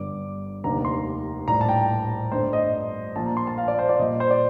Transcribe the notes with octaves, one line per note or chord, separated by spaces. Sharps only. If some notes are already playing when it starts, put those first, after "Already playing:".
Already playing: G1 G2 D3 D6
F1 D#2 D3 A#5
C6
A#1 A2 G3 A#5
A5
G5
G1 G2 D3 A3 C5
D#5
A#1 A#2 F3 A5
A#5
C6
A5
F5
D5
C5
D5
A#1 A#2 G3 D#5
C5
D5